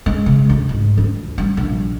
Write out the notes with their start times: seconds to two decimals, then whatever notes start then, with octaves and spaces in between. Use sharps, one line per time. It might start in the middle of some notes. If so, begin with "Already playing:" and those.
0.06 G#3
0.26 C#3
0.49 D2
0.69 G#2
0.97 D2
1.38 G3
1.57 A#1